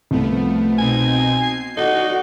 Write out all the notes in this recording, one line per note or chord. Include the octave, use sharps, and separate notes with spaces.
C2 F3 A3 B3
B2 C4 D#4 G#5
C7
D#4 F#4 A4 D5